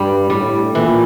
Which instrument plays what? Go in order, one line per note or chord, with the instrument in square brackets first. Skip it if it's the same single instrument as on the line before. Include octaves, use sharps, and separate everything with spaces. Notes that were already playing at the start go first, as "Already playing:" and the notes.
Already playing: [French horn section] G2 [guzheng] G3 D4 G4
[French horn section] A2 [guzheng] G3
[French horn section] A#2 [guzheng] E3